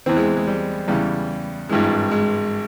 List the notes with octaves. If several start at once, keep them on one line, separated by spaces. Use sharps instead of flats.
E2 E3 C4
G#3
G#3
G3
E2 C#3 E3 G3
G#1 G2 E3 G#3
G#3